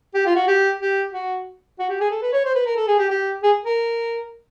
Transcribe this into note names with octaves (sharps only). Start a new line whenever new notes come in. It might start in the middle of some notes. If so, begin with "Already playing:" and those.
G4
F4
F#4
G4
G4
F#4
F#4
G4
G#4
A4
B4
C#5
C5
B4
A#4
A4
G#4
G4
G4
G#4
A#4